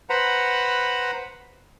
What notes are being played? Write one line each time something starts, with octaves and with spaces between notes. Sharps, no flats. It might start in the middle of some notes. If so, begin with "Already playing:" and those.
B4 C5 F#5 A#5 B5